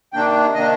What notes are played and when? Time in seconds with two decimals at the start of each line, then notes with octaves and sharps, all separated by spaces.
0.13 C3 D#3 A#3 D4 G5
0.54 C3 D#3 A#3 D4 D#5